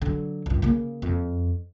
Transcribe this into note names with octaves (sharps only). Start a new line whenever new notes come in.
D3 F#3
C#2 G2
C#3 A#3
F2